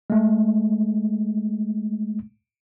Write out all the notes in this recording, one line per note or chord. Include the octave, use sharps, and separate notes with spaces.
G#3 A3